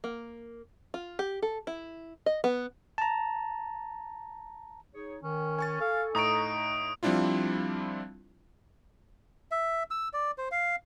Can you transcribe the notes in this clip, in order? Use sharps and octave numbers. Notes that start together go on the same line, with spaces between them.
A#3
F4
G4
A4
E4
D#5
B3
A5 A#5
D#4 G#4 C#5
D#3 C#4
G#5 C#6 A6
A4 F5
A2 D#4 A#5 C#6 D#6 D7
F3 G3 C4 D4 E4 F4
E5
E6
D5
C5
F5